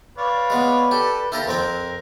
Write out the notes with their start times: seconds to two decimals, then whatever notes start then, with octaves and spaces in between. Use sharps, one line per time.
0.18 B4 C#5 D5 F5
0.50 G#3 B3
0.91 G4 A4 D5
1.32 E4 F4 G4 A4 A#4
1.47 F2 C4 A#4 G5